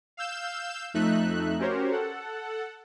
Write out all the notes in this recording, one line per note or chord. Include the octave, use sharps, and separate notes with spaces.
F5 E6 G6 E7
F2 A3 D#4 E5 F#6
C#4 F#4 G4 A#4 C5 C#5
A4 F#5